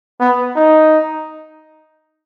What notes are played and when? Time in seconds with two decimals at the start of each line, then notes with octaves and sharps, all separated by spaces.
0.20 B3
0.56 D#4